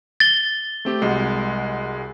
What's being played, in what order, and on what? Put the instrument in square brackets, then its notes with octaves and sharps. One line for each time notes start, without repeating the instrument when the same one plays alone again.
[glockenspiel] A6 G7
[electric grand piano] A3 C4 G4
C2 G#3 F#4